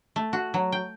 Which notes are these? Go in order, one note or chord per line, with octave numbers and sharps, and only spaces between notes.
A3
F#4
F#3
G5